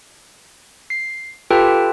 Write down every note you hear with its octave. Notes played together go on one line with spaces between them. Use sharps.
C7
F4 G4 A4 B4 G5 A5